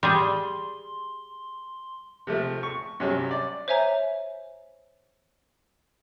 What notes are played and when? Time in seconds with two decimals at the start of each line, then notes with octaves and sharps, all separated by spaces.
0.03 G3 G#4 C6
2.27 C3 F3 A3
2.63 C#6
3.00 G2 C3 F#3 C#4
3.31 D5
3.68 C5 C#5 E5 G#5 A#5